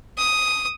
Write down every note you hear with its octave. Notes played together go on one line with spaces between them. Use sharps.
D#6